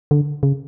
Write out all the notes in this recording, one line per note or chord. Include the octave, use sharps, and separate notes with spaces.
D3
C#3